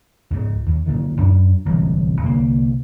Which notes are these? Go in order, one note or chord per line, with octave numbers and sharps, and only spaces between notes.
C#2 G#2 C#3
D#2
C#2 A#2 D3 D#3
F#2 D4
D1 C2 E3
C2 D3 A#3